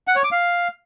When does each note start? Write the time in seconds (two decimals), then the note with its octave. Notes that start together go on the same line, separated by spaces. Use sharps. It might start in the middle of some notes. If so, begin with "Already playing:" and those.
0.08 F#5
0.16 C#5
0.24 D6
0.32 F5